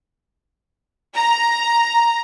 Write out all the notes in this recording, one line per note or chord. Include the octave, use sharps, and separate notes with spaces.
A#5